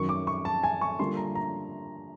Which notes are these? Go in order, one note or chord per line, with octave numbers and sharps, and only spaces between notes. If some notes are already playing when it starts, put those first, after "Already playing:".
Already playing: F#2 D#3 F#3 C#6
D6
C#6
A5
G#5
C#6
D3 G3 A#3 D4 F4 C6
A#5
A#5